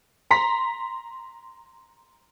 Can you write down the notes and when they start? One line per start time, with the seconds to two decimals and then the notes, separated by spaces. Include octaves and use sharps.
0.31 A#5 C6 B6